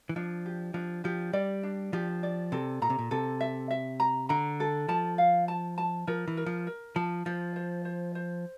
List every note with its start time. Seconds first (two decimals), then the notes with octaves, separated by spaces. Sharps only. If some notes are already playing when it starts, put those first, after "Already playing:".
0.09 E3
0.16 F3 D4
0.46 G4
0.74 F3 D4
1.04 F3 G4
1.33 G3 D5
1.63 D4
1.93 F3 G4
2.23 D5
2.52 C3 A4
2.82 A#2 A#5
2.90 C3
2.99 A#2
3.11 C3 A4
3.41 E5
3.71 E5
4.00 A#5
4.29 D3 A#5
4.60 A4
4.88 F3 A5
5.18 F5
5.48 A5
5.78 A5
6.07 F3 A#4
6.28 E3
6.37 A#4
6.46 F3
6.67 A#4
6.96 F3 A5
7.26 F3 C5
7.56 C5
7.85 C5
8.15 C5